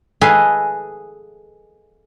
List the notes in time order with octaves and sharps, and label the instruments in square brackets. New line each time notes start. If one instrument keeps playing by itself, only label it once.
[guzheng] G#4 A4 B4 D#5 F5 G#5